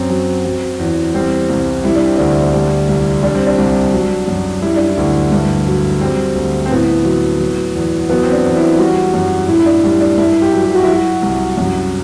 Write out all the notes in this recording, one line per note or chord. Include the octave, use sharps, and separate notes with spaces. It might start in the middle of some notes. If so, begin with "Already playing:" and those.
Already playing: F#2 C4
F#3
F#3
E2
G3 C4
C2
G3 E4
D4
C4
D2 D4
G3
C2
G3 D4
C4
D4
C2
F#3
F#2
G3 E4
D4
E4
D2
G2
F#3
G3 C4
D2
C4
A2 B3
F#3
F#3
E2
F#3 B3
C4
D4
E2
E4
G3 F#4
F#2
A2 E4
E4
D4
G3 E4
D4
G2 E4
G4
F#3
G4
F#4
F#3 E4
F#4
C2
F#2